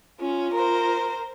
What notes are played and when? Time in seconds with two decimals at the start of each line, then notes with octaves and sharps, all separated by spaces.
0.20 C#4 F4
0.54 A#4 C5